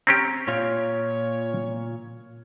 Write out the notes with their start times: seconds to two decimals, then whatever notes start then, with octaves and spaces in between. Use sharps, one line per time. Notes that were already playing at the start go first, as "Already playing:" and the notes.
0.07 C4 C#4 G4 A#5
0.48 A#2 F4 C#5 F5